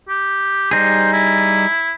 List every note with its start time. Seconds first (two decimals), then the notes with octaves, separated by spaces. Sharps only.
0.09 G4
0.71 G3 D#4 G#4 C5
1.13 E4